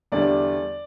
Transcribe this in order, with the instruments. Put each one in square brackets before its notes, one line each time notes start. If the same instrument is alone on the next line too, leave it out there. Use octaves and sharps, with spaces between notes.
[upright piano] E2 D3 G3 D5